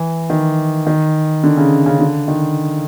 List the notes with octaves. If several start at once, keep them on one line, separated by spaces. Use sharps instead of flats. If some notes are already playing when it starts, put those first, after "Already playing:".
Already playing: E3
D#3
D#3
D3
C#3
C#3
D3
D#3